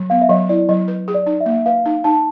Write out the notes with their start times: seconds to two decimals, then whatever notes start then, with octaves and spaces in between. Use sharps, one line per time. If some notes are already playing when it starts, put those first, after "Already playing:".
Already playing: F#3
0.10 B3 F5
0.22 E5
0.29 F#3 D#5
0.49 E4 D5
0.69 F#3 D#5
0.88 B4
1.08 G#4
1.14 D5
1.26 D#4
1.41 E5
1.46 A#3
1.66 B4 F5
1.86 D#4
2.04 D#4 A5